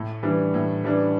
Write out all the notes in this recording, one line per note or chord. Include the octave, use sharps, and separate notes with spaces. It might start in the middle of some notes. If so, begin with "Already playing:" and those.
Already playing: A2
E3 G3 D4
A2
E3 G3 D4